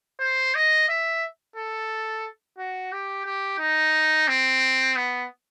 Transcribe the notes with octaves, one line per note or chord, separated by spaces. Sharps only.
C5
D#5
E5
A4
F#4
G4
G4
D#4
C4
B3